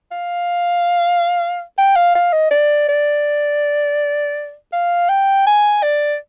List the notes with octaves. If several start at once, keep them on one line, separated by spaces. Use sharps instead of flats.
F5
G5
F5
F5
D#5
D5
D5
F5
G5
G#5
D5